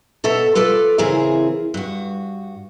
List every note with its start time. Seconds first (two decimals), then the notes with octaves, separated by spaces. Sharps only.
0.24 B2 A4 C#5 E5
0.55 F4 A4 B4 D5
0.98 C#3 E3 C4 E4 G#4 A#4
1.74 G2 F#4